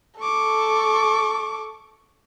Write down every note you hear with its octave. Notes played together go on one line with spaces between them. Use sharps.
A4 C#6 D6